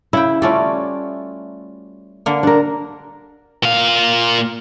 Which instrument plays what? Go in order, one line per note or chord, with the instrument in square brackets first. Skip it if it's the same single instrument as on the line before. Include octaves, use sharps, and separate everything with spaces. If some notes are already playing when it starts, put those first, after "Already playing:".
[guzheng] C#3 G5 [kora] E4
[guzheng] G3 A3 F#4 [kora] C#4 F4 D5
[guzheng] D3 A#3
[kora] D4 A#4
[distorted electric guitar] A#2 F5